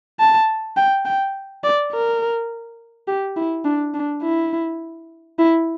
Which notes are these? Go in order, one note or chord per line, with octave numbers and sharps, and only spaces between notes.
A5
G5
G5
D5
A#4
G4
E4
D4
D4
E4
E4